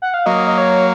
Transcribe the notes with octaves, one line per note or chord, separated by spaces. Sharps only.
F#5
F5
F#3 A#3 D#5
D#5
C#5